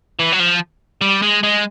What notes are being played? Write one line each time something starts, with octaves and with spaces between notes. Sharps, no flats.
E3
F#3
F3
G3
G#3
G#3